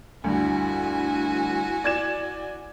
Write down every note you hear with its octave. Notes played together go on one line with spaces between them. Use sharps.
D2 G2 E4 F#4 G#5
D5 G#6 E7